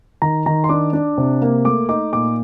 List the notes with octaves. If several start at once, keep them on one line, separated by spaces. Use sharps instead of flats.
D#3 A#5
D#3 A#5
C6
D4 D6
D4
C3
A#3
A3 D6
D#4 D6
A#2 D6